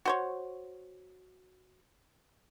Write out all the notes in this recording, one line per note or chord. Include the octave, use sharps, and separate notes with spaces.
F#4 C5 C#5